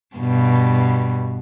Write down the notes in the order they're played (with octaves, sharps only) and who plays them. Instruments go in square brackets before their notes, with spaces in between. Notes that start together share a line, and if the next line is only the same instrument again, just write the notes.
[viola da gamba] G2 B2